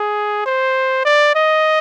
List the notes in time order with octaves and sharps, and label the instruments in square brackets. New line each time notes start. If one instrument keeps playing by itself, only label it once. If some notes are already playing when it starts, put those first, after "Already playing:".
Already playing: [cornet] G#4
C5
D5
D#5